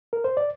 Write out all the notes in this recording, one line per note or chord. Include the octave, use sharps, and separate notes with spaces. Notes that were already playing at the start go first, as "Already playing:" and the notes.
A#4
C5
D5